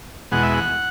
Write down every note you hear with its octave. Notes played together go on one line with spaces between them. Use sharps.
E2 B2 G#3 F#5
E5
F#5